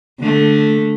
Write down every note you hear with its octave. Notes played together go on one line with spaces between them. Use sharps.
D3 A3